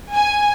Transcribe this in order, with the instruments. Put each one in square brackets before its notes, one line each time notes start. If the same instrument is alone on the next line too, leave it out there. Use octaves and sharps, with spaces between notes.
[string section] G#5